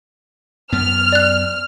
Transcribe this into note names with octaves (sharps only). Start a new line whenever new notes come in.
F#2 B3 F6
D5 F#6